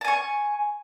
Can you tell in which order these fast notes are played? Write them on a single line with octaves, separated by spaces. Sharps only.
A5 G#5 C#6